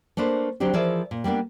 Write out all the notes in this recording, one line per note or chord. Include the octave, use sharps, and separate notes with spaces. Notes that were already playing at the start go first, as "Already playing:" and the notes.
A3 A#3 D4 B4 C5
D3 F#3 C4 D4 G4
E3 F3 G#4 A#4 D5 E5
A#2
G3 A#3 B3 D4